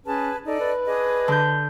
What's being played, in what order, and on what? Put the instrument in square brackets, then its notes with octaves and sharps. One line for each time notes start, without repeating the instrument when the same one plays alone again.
[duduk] C#4 [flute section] G#4 B4 A5
[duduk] D#4 [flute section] A4 D5 D#5
[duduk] B4
[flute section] D4 G#4 D#5
[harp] D3 G6